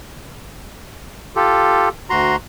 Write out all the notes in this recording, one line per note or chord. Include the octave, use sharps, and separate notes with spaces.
F4 G4 A4
D2 F#4 A#5 C6